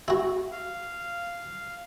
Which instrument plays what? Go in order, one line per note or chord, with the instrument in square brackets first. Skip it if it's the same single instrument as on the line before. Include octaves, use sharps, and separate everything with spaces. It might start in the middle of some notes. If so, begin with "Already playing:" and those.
[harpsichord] E4 F#4
[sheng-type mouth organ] F5